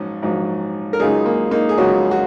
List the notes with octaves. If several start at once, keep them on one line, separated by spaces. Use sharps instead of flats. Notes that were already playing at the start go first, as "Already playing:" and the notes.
Already playing: A#1 G#2 F#3 C#4
A#1 G#2 F#3
A#4
C#2 C#3 F#3 D#4 G#4
A#3
A#3 D#4
G#4
C#2 C#3 F#3 C#4 F#4
F#4